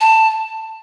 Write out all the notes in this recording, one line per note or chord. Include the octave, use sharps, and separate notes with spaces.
A5